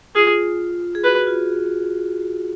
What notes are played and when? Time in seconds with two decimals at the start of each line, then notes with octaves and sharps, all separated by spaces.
0.16 F4 G#4
0.95 G#4
1.04 F#4 B4
1.27 F4